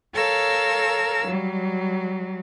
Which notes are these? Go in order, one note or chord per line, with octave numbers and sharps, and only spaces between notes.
A4 A#4 C#5 F5 E6
F#3 G3